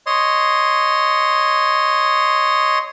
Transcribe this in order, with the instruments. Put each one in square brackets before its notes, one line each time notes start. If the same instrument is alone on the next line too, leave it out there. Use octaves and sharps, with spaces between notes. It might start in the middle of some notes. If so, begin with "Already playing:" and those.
[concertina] C#5 D#5 C6